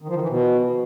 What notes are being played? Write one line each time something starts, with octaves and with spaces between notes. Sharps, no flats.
D#3
F3
D#3
E3
B2